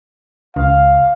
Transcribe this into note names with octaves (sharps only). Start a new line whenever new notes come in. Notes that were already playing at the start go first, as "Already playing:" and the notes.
C#2 F5